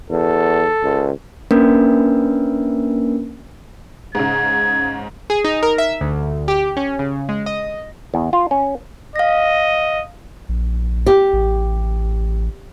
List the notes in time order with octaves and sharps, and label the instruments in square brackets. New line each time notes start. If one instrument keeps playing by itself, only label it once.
[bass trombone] E2 [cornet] A4
[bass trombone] C#2
[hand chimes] A#3 C#4 D4 A#4 B4
[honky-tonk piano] G#2 C#3 [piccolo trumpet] G#6
[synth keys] G#4
D#4
A#4
E5
D2
G4
C#4
C#3
G#3
D#5
[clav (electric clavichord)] E2
F4
C#4
[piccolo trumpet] D#5 [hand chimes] F5 A#6
[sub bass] A#1
[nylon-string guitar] G4
[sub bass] A1